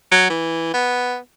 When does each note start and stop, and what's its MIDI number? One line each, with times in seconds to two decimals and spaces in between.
0.11 0.29 54
0.30 0.70 52
0.74 1.17 59